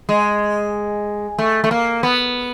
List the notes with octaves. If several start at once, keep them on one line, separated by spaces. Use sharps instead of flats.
G#3
A3
A3
A#3
B3